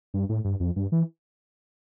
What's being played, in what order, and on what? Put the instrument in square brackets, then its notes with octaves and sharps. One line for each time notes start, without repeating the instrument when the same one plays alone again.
[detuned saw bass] G2
A2
G2
F2
G2
E3